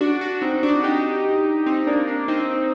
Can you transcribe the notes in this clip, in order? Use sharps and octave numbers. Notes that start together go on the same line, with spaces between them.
D4 F#4
D4 F#4
C4 D#4
D4 F#4
D#4 G4
C4 D#4
A#3 D4
A#3 D4
C4 D#4